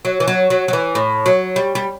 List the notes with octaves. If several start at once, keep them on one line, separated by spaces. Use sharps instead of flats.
F#3
E3
F#3
F#3
F#3
E3
A2
F#3
G3
G3